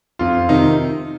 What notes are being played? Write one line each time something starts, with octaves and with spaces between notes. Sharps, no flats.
F2 F4
C3 D#3 D#4